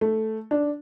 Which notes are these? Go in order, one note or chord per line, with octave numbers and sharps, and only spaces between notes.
A3
D4